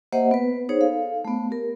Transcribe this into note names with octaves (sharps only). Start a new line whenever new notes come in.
A#3 G4 C5 D#5 E5 F#5
B3 B4
D#4 G#4 C5 C#5
A4 F5
A3 B3
G4 A#4